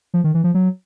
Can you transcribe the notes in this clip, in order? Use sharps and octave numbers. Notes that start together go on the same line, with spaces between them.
F3
D#3
E3
F3
F#3